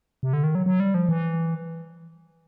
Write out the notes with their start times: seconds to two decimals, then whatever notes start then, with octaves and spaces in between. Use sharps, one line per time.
0.23 C3
0.33 D3
0.44 D#3
0.55 F#3
0.66 F#3
0.80 G3
0.94 F3
1.09 E3